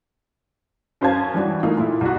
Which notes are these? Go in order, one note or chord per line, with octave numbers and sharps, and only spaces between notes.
F#2 C#4 C5 F5 A5 G#6
E3 G3 D4 F#4
A3 A#3 D#4 F4
A#2 E4
C2 F#4